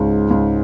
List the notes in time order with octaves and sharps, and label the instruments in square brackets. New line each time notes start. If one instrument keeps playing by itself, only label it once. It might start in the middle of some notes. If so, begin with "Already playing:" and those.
Already playing: [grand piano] C#2 [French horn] G#2
[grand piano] C#2